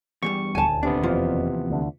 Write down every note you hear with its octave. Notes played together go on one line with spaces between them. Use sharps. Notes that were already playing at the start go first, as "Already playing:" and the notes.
E2 G2 G3 C#6
D#1 D2 G#5 A5
D#2 C3 B3 D4
E1 F2 E3 F3 F4
D2 D3